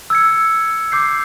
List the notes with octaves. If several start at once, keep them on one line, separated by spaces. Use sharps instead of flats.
E6 G#6 C#7
D6 G6 C7